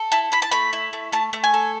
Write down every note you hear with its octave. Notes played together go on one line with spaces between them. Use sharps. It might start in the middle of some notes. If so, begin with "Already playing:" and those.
Already playing: A4
E4 A5
E4 B5
A5
A3 B5
E4
A3
A3 A5
A3
G#5
A4